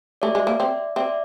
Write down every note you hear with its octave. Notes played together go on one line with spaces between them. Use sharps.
A3 D5 E5
G#3
A#3
C4
C4 D5 E5